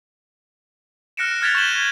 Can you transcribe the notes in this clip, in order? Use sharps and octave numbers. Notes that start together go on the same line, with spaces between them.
F6 F#6 A#6 C#7 D7 E7
F6 G#6 A6 B6 F7
C#6 G6 A#6 E7 F#7 G7